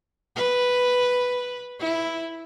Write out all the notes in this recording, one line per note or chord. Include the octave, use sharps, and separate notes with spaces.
B4
E4